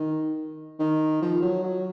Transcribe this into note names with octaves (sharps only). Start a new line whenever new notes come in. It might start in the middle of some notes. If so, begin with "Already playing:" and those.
Already playing: D#3
D#3
F3
F#3
F#3